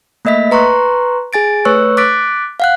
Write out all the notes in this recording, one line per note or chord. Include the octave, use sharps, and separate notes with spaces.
A3 A#3 D#5 E5 B6
B4 A#5 C6 C#6 F#6
G#4 G#5 A6 D7
A3 B4 C#5 C#6 E6 F#6
D6 F#6 A6 B6 D7
F5 F#5 F#6